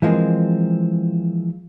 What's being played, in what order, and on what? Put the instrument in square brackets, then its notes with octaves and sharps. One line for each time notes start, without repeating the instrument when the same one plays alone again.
[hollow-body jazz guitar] E3 F3 G#3 A#3 C4